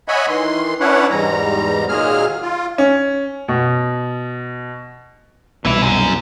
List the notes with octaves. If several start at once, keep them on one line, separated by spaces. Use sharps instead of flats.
C#5 D#5 E5 F#5 G#5 B5
D#3 E3 C6
C#4 D4 E4 B4 C#5 F#5
E2 G#2 G3 A#5
D#2 A#2 F#3 G#3 G#4 F6
F4
C#4
B2
C2 B2 E3 E4
F#2